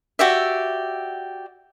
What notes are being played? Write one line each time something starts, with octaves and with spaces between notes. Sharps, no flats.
F#4 G4 D5 E5